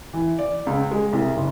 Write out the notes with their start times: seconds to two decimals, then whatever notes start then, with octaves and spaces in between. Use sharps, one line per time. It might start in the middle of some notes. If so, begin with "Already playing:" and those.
0.14 E3
0.39 D5
0.67 C#2
0.91 G#3
1.13 C2
1.36 F#1